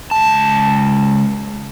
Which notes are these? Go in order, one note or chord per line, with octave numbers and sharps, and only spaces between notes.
C#2 A5